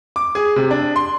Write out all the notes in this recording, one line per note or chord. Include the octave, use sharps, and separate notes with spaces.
D6
G#4
C3
D4
C6